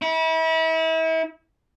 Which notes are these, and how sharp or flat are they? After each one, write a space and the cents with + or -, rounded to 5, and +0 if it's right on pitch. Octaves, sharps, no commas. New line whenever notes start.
E4 -35